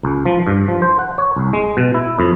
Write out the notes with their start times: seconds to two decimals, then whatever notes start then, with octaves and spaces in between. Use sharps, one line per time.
0.03 C#2
0.26 F3
0.47 G2
0.68 F3
0.82 C5
0.99 F#5
1.18 C#5
1.36 C2
1.53 G#3
1.77 B2
1.94 E4
2.19 F2